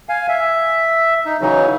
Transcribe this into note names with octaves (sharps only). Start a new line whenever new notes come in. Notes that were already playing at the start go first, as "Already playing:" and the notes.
F5 G#5
E5
D#4
C#3 E3 F#3 D#4